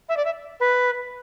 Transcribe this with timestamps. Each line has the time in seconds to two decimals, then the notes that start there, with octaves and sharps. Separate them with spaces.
0.09 E5
0.17 D5
0.25 E5
0.60 B4